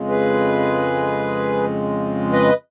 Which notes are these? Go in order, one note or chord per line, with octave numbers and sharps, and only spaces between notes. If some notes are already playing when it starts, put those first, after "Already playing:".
Already playing: F2 C#3 G#3
G#4 B4
B4 D#5